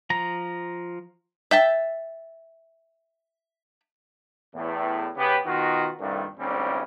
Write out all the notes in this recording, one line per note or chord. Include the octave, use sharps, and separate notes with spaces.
F3 A#5
E5 G5 A5
E2 A2
C#3 B3 G4
B2 D#3 D#4 F4 F#4
C2 G2 A#2 D#3 A3
A1 D2 G#2 G3 C4 C#4